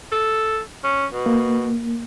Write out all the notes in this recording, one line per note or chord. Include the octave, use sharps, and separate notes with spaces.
A4
C#4
B2
A#3